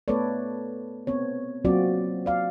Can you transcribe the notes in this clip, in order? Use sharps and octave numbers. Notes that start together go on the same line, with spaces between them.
A3 B3 A4 B4 C#5 D5
B3 C4 C#5
F#3 A#3 C4 F4 F#4 D5
D5 F5